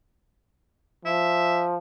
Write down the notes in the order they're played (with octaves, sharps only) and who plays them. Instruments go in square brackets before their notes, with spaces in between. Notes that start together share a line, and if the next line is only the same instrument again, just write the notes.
[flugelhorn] F3 [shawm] E5